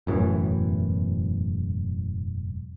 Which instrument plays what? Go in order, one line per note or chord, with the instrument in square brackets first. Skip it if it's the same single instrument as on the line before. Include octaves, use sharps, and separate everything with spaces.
[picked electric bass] E1 F#2 A2 E3